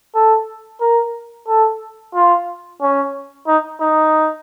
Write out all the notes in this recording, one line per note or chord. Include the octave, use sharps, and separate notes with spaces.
A4
A#4
A4
F4
C#4
D#4
D#4